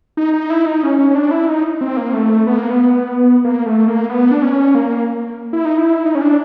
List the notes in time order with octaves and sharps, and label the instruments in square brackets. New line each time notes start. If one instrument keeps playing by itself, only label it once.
[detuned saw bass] D#4
D#4
E4
D#4
C#4
C#4
C#4
D4
E4
D#4
C4
A#3
A3
B3
A#3
B3
A#3
A3
A#3
B3
D4
C#4
A#3
E4
D#4
E4
D#4
C#4
D4